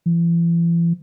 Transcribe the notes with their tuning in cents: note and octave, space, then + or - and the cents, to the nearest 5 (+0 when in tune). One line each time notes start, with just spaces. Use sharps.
E3 +40